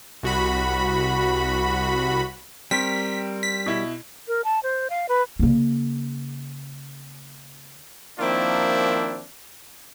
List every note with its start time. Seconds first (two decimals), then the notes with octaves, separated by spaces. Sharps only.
0.23 C2 F#4 B5
2.71 G3 C4 A#4 C#6 B6
3.43 B6
3.66 B2 E4
4.28 A#4
4.45 A5
4.63 C5
4.90 F5
5.09 B4
5.39 C#3 A#3
8.19 D#3 F3 A#3 C4 D4 E4